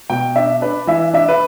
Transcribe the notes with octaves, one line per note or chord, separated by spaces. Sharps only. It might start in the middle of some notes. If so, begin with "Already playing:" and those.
B2 G5
D4 E5
D4 B4
E3 E5
D4 E5
B4